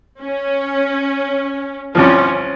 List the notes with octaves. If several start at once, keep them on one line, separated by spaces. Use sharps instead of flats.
C#4
C2 C3 F3 C#4